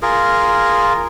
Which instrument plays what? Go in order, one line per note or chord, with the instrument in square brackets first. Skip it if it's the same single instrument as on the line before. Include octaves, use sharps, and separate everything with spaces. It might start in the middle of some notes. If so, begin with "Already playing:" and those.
[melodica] F4 G#4 A#4